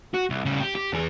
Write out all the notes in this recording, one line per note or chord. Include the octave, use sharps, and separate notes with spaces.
F#4
C2
C#3 G3
G4
G4
E2 G#4